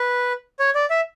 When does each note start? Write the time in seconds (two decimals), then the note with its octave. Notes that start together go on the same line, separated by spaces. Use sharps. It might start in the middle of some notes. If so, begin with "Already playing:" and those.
Already playing: B4
0.59 C#5
0.75 D5
0.90 E5